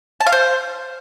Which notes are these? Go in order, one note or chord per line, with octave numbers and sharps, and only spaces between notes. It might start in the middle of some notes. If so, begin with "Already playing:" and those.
A5
F5
C5